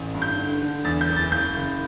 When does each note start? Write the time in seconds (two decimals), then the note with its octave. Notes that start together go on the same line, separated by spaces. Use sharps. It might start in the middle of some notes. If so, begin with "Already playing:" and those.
Already playing: A1
0.14 G2
0.22 G6
0.37 D3
0.62 D3
0.85 E2 A6
1.01 G6
1.09 F#1
1.16 A6
1.32 F#1 G6
1.56 F#1